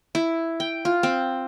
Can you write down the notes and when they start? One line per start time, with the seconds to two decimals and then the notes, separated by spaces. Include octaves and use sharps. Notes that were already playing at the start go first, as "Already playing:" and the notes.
0.15 E4
0.60 G5
0.85 F4
1.03 C4